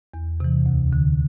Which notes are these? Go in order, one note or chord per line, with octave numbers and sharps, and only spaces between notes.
E2
C3 E3
D2
D3